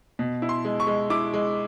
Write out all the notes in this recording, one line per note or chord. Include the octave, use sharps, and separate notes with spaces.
B2
E4
C6
G#3
C#6
G#3
E4 D6
G#3